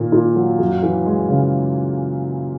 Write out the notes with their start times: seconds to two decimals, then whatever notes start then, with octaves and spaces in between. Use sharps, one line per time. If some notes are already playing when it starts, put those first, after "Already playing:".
Already playing: A#2 D#3 A#3
0.12 A#2
0.35 F#3
0.59 F#2
0.82 E3
1.06 G#3
1.29 C#3